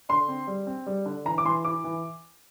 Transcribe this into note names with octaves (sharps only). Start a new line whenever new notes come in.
D3 C6
C4
G3
C4
G3
D3
E3 A#5
D6
E3 C6
E4 D6
E3